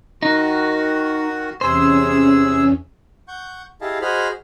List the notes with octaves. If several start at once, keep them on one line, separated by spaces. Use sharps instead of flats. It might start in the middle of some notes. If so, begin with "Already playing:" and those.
D#3 D#4 F#4
E2 C3 C#4 G#4 C5 E6
F#5 C#6 G6
E4 G4 G#4 D#5 F5 A5
F#4 G#4 C5 D#5 B5 F6